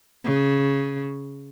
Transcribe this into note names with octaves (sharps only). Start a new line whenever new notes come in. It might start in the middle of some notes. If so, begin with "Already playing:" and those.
C#3